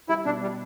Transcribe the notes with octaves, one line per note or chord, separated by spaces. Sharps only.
G3 E4
B2 D4
G3